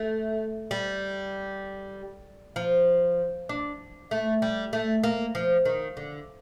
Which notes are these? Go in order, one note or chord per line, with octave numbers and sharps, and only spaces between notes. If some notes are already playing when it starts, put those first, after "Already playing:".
Already playing: A3
G3
F3
D4
A3
G3
A3
A#3
F3
D#3
D3